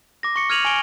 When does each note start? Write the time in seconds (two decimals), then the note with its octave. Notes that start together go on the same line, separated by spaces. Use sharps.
0.23 D6 A#6
0.36 C#6 C#7
0.50 F6 G#6 D#7 F7 F#7
0.65 G#5 C#6 D7 G7